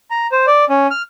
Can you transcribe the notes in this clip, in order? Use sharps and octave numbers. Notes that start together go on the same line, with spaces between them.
A#5
C5
D5
C#4
F6